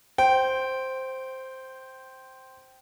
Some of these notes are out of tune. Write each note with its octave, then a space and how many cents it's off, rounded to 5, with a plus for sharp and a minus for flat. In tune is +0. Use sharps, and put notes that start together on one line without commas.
C5 +0 G5 -15